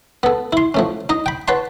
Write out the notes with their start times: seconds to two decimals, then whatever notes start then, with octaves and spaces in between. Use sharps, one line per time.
0.23 B3 A4
0.53 E4 C6
0.74 F3 A3 C#4
1.09 D#4 D#5
1.26 G5 B5
1.48 B4 C#5 F#5 A5 C6